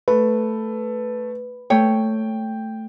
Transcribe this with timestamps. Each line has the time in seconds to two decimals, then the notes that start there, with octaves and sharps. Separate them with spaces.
0.08 A3 B4
1.70 A3 C#5 G5